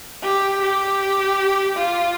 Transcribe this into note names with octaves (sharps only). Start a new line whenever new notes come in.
G4
G4
F4